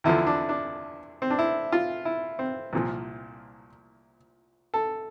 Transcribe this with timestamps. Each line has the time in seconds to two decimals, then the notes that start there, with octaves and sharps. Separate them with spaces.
0.04 E2 D3 F3 E4
0.27 D4
0.49 D4
1.22 C4
1.30 D4
1.39 E4
1.72 F4
2.05 E4
2.39 C4
2.73 C2 A#2 F3
4.74 A4